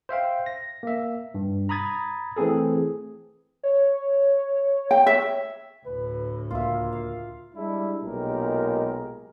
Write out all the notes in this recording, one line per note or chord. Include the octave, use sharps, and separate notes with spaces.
C5 E5 F5 G5
A#6
A#3 E5
G2
A#5 B5 D#6 G#6 A6
E3 A3 C4 G#4 A4
C#5
G5
E5
D2 A2 B4
C#2 A#3 F4 E5
F5
G3 G#3 D4 E4
B1 A#2 G#3 G4 A#4